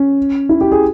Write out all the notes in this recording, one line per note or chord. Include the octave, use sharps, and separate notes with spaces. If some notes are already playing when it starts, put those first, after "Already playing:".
Already playing: C#4
E4
G4
G#4